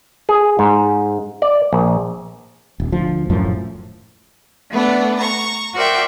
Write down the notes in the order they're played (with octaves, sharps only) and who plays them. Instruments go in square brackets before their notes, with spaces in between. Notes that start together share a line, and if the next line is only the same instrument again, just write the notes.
[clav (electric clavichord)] G#4
G#2
D5
A#1
[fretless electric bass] D#1
D2 F3
D#1 F#2 A2 F3
[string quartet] A3 B3 D4
A#5 C#6
F#4 A#4 C5 D5 E5 G5